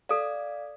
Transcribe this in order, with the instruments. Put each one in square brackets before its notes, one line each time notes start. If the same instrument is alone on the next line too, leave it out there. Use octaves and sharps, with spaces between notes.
[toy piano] A4 [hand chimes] D5 F5